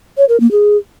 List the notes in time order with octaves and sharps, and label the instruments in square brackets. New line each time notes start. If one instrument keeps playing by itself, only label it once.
[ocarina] C#5
A#4
A#3
G#4